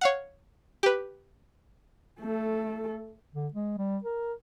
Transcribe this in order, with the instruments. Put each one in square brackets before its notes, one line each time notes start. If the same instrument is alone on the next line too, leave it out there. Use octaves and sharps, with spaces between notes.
[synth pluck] C#5 F5 F#5
G4 B4
[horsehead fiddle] A3 A4
[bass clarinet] D3
G#3
G3
A#4